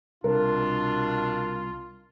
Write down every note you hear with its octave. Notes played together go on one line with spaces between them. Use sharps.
C2 B2 D4 F4 A#4